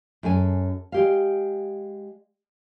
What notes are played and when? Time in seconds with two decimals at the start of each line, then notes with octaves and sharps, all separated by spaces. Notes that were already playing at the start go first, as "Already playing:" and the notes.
0.23 F#2 G#4 A4 G#5
0.92 G#3 G4 F5